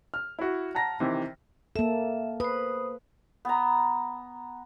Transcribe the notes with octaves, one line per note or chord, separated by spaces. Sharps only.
F6
E4 F#4
F#5 A5 A#5 A#6
C3 D#3 E3
A#3 A4 E5
B4 C5 D#6
B3 A#5